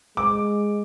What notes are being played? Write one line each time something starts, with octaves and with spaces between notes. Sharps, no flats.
G#3 D6